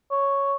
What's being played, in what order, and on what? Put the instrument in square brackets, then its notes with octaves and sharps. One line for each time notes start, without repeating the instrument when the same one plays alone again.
[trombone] C#5